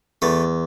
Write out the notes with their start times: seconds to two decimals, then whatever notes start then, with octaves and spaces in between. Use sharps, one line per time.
0.22 E2 A3